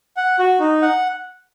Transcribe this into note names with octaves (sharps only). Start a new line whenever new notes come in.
F#5
F#4
D#4
F#5